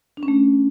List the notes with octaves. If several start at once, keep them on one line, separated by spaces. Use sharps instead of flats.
D4
C#4
A3